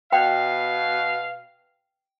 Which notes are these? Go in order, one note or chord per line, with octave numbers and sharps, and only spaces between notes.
B2 F5 G5